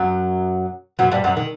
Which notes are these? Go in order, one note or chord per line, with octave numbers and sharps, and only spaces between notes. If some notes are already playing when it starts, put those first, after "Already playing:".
Already playing: F#2 F#3
F#2 F#3
G2 G3
F#2 F#3
D#3